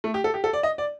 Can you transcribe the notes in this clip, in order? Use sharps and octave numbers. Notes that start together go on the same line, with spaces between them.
A3
G4
A4
G4
A4
D5
D#5
D5